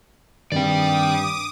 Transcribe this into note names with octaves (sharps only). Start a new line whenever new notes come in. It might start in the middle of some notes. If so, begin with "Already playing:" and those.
G2 D#3 C4 D5 G5 D6 D#6